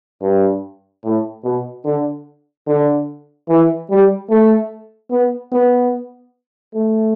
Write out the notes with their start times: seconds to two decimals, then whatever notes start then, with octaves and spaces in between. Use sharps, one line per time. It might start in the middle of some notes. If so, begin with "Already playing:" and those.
0.21 G2
1.04 A2
1.44 B2
1.85 D3
2.67 D3
3.49 E3
3.90 G3
4.29 A3
5.11 B3
5.52 B3
6.75 A3